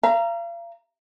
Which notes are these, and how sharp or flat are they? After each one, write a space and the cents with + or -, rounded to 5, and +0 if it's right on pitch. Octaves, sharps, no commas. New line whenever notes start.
F5 -40 A#5 +0